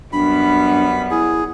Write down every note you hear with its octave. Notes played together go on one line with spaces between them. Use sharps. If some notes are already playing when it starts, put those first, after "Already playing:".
F#2 G3 B3 D4 B5
E4 G#4